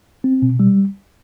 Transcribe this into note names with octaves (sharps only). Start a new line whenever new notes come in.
C4
B2
G3